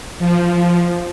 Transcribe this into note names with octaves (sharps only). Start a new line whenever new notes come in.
F3